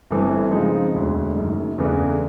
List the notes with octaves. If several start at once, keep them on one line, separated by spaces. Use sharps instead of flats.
G1 G2 E3 A3 C4
C#3 F3 G#3 C4 D#4
E1 D2 D3
F#1 F#2 D#3
E2 C#3 E3 A3 D4